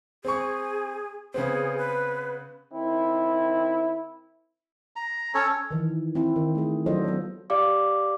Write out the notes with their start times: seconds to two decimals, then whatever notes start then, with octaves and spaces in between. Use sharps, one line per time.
0.25 C4 G#4 C#6
1.34 C#3 B3 C4 G#4
1.78 B4
2.73 D#3 C4 E4
4.96 A#5
5.34 C#4 A4 C#5
5.71 D#3 E3
6.15 C4 E4
6.36 D#3
6.55 A3 G#4
6.86 F#3 D4 F4 A4 C5 D#5
7.05 F#3 B3
7.50 G4 D5 F5 D6